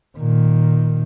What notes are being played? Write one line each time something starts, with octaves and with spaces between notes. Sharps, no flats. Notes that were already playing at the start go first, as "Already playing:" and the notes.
A#2 D#3